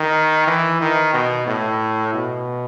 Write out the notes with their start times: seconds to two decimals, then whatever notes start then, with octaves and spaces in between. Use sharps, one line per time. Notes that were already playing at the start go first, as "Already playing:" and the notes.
Already playing: D#3
0.47 E3
0.81 D#3
1.14 B2
1.47 A2
2.14 B2